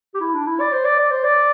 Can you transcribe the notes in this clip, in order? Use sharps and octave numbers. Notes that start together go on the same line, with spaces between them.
G4
E4
D4
E4
D5
C5
D5
D5
C5
D5